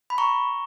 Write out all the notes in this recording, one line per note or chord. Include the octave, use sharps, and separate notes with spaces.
B5
A#5 C#6